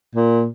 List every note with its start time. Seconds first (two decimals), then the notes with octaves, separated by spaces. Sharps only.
0.15 A#2